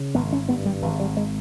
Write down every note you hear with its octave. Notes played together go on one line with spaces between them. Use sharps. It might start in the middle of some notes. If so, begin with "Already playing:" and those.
Already playing: C#3
G#1 B3
C#4
G2 B3
G3
G#1 E3
G3
G#3